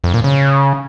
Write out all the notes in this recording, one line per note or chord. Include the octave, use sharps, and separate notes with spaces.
F2
A#2
C#3